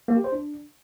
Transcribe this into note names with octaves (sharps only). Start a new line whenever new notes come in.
A#3
G4
C5
D4